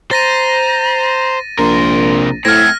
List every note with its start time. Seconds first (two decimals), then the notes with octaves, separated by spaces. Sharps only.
0.11 C5 A#5 A6 A#6 D#7
1.59 A#1 C3 A#4 C6
2.45 A2 A3 C4 F6 G#6 A#6